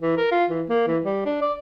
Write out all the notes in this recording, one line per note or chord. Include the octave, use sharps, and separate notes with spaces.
E3
A#4
F4
E3
A#3
E3
G3
D4
D5